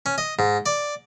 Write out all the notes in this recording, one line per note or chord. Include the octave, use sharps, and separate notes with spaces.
C#4
D#5
G#2
D5